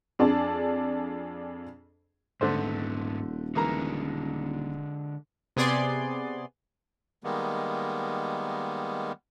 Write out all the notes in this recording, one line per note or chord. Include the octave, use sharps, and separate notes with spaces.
F2 D4 G#4 D5 A5
D#1 G#2 D3 A3 B3 C5
D3 E3 G#3 A#3 A#5
C3 B3 G#4 D5 C6
D#3 G3 G#3 A#3 B3